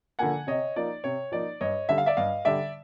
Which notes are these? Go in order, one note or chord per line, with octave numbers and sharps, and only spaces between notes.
D3 F3 A#3 F#5 G#5
C3 C#5 D#5
F3 A#3 D#4 D5
C3 C#5
F3 A#3 D#4 D5
G2 C#5 D#5
D3 G3 E5
F5
D5 E5
G2 D#5 F5
D3 G3 D5 E5